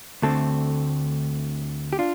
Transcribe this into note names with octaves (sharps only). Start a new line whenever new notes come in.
D2 D3 A3 C4 A4
G4
D4 F4